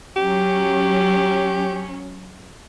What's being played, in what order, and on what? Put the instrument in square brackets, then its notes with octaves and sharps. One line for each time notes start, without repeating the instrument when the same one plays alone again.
[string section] F#3 C#4 [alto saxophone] G4